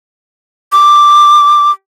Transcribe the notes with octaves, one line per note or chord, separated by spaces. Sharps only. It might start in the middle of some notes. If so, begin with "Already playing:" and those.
D6